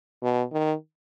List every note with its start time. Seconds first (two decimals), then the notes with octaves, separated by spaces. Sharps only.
0.22 B2
0.52 D#3